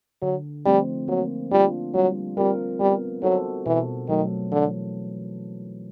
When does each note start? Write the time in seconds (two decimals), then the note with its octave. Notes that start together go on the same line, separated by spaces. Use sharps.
0.22 D3 F#3
0.65 F3 G3 A3 C4 D#4
1.08 F#3 A#3
1.51 G3 D4 F4
1.94 F#3 G3
2.37 G3 C4 F4 A#4
2.80 G3 B3
3.23 F#3 D#4 F#4 A4 C5
3.66 B2 E3
4.09 D#3 F#3 A3
4.52 D3 E3